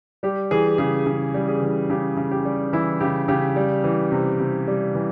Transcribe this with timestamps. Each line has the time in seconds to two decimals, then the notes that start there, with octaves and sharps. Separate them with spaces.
0.23 G3 G4
0.51 E3 G#4
0.78 C#3 G#4
1.06 C#3 G#4
1.34 G3
1.48 G#4
1.62 E3
1.90 C#3 G4
2.17 C#3
2.31 G4
2.45 G3
2.73 E3 E4
3.00 C#3 G4
3.28 C#3 G4
3.56 G3
3.84 E3
4.12 C3
4.40 C3
4.68 G3
4.95 E3